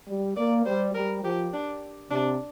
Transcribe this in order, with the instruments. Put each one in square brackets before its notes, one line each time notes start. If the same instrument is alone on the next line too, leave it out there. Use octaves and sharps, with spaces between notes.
[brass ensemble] G3
[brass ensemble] A#3 [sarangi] D5
[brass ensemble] G3 [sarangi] C5
[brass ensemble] G3 [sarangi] A#4
[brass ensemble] F3 [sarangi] G4
[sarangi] D4
[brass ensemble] C3 [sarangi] D4